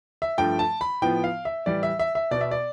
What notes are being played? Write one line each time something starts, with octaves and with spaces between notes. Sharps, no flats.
E5
G2 F3 A3 G5
A5
B5
A2 F3 B3 G5
F5
E5
A2 E3 G3 D5
E5
E5
E5
B2 B3 D5
E5
D5